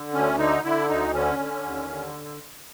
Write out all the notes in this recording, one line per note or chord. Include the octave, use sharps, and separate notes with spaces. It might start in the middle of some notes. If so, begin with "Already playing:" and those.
Already playing: D3
D2 C#4
D3 D#4
D3 E4
D2 D#4
D3 C#4
D3
D#2
D3